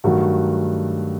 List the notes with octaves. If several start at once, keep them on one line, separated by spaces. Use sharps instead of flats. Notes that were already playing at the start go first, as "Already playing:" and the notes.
G2 D#3 F#3 A3 F#4